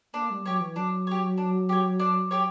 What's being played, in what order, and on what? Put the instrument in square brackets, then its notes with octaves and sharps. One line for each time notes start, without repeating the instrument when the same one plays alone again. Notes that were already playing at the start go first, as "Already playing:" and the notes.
[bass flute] A#3 [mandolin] D4
[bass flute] G3
[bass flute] F#3 [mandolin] G4 C#5
[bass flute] E3
[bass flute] F#3 [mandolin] D4
[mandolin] G4 C#5
D4
G4 C#5
D4
G4 C#5